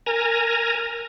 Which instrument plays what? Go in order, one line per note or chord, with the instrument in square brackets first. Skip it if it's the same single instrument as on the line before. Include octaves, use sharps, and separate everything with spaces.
[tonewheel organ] A#4 G#5 A#5